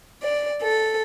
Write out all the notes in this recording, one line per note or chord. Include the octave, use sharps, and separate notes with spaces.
D5
A4